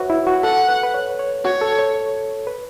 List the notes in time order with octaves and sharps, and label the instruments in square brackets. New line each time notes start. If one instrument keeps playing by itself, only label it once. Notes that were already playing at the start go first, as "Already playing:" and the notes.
Already playing: [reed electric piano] F#4 B4 C#5 E5
E4
F#4
[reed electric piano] A4 [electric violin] F#5
[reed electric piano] B4
B4
C#5
C#5
[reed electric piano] F#4 [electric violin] C#5
[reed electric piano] A4
C#5
B4